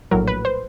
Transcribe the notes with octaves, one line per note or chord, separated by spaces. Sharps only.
A#1 A2 F#3 A#4
B4
C5